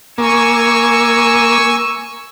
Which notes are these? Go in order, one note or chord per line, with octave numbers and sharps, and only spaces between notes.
A#3 G#5 C#6 E6